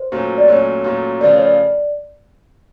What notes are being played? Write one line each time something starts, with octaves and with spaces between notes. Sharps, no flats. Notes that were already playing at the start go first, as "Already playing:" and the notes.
Already playing: C5
A#2 F#3 A3 C#4
D5
A#2 F#3 A3 C#4 C#5
A#2 F#3 A3 C#4
C#3 F3 A3 D5
C#5
D5